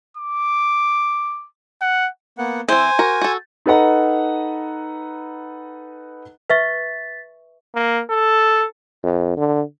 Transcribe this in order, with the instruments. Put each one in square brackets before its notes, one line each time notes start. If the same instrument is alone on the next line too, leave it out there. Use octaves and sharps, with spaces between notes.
[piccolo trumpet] D6
F#5
[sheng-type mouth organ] A#3 B3 F#5
[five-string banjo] E3 C4 [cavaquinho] C5 [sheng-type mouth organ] G#5
[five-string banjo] F#4 A#4
F#4 A4
[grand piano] D#4 A4 B4 D#5 F#5 A#5
[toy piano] B4 E5 C#6 [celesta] A6 B6
[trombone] A#3
A4
[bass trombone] F2
D3